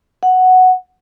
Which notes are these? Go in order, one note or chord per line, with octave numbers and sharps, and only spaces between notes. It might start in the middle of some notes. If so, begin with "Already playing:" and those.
F#5